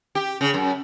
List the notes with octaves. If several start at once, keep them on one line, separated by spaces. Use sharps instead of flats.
G4
C#3
F#2